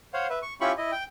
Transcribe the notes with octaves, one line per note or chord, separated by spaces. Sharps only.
C5 C#5 F5 F#5
B4 E5
C#6
C#4 E4 F4 G4 B5 C#6
E4 D#5
G5